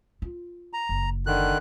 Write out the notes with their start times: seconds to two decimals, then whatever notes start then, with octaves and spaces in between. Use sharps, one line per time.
0.22 F4
0.73 A#5
0.89 F#1
1.26 D3 D#3 F#6